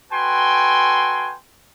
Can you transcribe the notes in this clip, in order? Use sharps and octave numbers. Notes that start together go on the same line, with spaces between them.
F#4 A4 B4 G5 G#5 C6